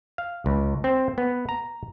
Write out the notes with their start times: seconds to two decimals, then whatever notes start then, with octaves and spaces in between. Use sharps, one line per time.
0.18 F5
0.46 C#2
0.84 C4
1.18 B3
1.49 A#5